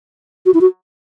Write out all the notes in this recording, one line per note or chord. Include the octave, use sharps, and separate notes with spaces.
F#4
E4
F#4